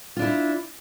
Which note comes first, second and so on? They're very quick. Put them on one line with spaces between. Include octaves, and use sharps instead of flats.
F4 D4 E4